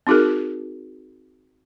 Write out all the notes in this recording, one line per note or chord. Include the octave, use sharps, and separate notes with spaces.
C4 D#4 F#4 G#4 A#4